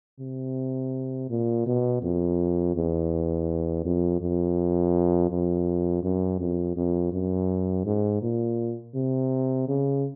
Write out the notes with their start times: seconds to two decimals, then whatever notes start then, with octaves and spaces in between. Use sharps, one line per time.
0.20 C3
1.30 A#2
1.66 B2
2.03 F2
2.75 E2
3.85 F2
4.21 F2
5.30 F2
6.03 F#2
6.40 F2
6.76 F2
7.13 F#2
7.85 G#2
8.22 A#2
8.95 C3
9.68 C#3